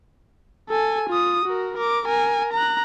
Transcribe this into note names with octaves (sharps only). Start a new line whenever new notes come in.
A4 G#5
F4 D#6
F#4 A#4
A#4 D6
A#4 G#5
A#5 F#6